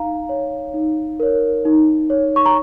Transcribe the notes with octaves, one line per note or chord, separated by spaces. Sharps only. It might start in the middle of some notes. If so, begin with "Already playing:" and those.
Already playing: D#4 F5 A#5
C#5
D#4
A#4 C#5
D#4
C#5
C#6
A#5